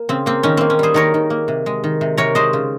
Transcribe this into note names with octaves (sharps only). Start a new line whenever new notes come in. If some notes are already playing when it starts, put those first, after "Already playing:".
Already playing: A#3
C#3 C4
A#3 C4
D#3 C#4
A#3 C4
C#4
G3 G#4 C5
D#3 A#4 C#5
D#3
A#3
C3
G#3
D#3
C3
C3 A#4 C#5
G#3 C5 D#5
C#3